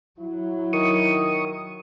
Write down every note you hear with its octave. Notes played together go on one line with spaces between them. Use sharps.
F#3 E4
D#3 C#6 D#6